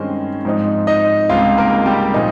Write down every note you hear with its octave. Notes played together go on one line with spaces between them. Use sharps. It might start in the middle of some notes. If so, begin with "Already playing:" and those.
Already playing: G2 D#3 G#3 C4 C#4 C5
G#2 F3 C4 D#4
D#4 D#5
C#2 C3 G3 C4 D#4 F4 F5
A#3 A#4
G3 G4
A#2 F3 A#3 D#4